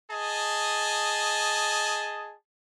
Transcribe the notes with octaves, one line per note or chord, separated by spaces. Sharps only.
G#4 D#5 A5